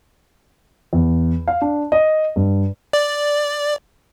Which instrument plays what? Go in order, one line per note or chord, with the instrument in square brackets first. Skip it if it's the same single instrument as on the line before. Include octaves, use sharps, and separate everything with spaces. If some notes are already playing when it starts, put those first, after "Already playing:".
[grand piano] E2
F5
D4
D#5
G2
[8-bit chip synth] D5